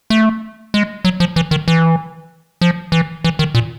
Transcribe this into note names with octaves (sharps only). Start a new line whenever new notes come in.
A3
G#3
F#3
F3
E3
D#3
E3
F3
E3
E3
D#3
A#2